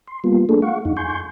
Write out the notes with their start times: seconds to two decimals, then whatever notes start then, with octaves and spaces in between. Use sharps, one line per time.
0.08 C6
0.24 G3 A#3 B3 F4
0.49 A3 A#3 D4 G#4 A4
0.62 F5 F#5 C#6
0.85 F2 D#4
0.97 G#5 C6 C#6 G6